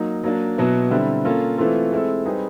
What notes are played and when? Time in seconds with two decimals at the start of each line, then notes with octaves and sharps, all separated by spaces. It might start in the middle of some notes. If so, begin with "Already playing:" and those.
Already playing: F#3 A#3 D#4
0.24 F#3 A#3 D4
0.58 B2 F#3 B3 E4
0.91 D3 G3 C4 E4
1.25 A#3 C#4 F4 A4
1.58 E3 A3 C4 F4 A4
1.92 G#3 C4 E4 A4
2.25 G3 C4 D#4 G#4 B4